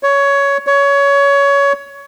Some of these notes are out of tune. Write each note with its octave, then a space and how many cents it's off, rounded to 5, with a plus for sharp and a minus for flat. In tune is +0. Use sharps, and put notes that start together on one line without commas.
C#5 +15
C#5 +20